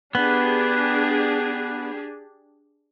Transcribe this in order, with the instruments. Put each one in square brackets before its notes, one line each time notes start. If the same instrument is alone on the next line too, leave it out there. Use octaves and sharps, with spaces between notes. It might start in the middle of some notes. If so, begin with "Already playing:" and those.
[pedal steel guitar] B3 [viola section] D4 G4 G#4